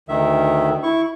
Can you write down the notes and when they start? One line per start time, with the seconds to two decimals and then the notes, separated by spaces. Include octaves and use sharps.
0.09 D2 D#3 E5
0.83 E4 C#6